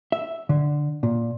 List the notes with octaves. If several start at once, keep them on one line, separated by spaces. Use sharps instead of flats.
E5
D3
A#2